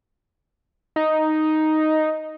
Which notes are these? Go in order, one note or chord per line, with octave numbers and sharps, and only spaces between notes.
D#4